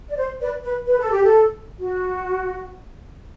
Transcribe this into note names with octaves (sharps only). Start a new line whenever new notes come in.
D5
C5
B4 D5
B4
B4
A4
G4
A4
F#4